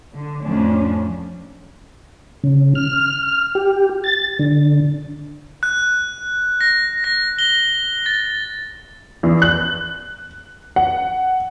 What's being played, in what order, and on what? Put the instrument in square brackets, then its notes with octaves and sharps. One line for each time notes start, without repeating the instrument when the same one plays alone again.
[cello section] D3
F2 A2 C#4 D4
[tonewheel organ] C#3
F6
G4
A6
D3
[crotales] F#6
A#6
A#6
G7
A6
[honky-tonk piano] E2
F#6
F#5